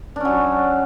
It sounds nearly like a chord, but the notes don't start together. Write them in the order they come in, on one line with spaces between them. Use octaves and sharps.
D4 C#4 F#3